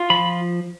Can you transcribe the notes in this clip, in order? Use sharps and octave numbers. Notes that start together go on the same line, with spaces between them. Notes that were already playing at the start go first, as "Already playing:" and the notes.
Already playing: F4
F3 B5